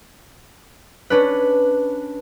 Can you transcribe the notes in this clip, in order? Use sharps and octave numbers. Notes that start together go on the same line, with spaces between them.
C#4 D4 B4